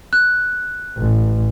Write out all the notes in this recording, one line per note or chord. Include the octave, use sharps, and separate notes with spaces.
F#6
A1